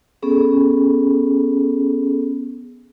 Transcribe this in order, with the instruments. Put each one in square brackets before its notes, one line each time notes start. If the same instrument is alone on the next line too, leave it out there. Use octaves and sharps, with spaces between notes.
[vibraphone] B3 C#4 G#4 A4